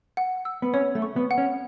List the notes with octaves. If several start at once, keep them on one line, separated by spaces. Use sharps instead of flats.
F#5
E6
B3
C#4 C#5
A3
C#6
B3
F#5
C#4